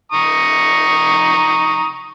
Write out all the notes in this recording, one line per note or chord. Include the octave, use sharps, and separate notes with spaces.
A#5 C#6 D#6